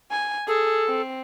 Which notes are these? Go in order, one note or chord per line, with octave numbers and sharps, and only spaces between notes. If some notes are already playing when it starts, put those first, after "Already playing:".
G#5
G#4 A4
C4